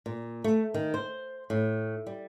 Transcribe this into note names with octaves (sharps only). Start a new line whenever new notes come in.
A#2
A3
D#3
C5
A2
G3